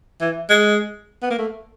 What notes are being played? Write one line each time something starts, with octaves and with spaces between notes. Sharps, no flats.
E3
G#3
B3
A#3
A3